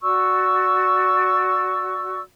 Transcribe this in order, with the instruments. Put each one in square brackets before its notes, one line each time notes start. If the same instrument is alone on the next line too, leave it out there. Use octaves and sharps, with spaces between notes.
[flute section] F#4 D5 C#6 E6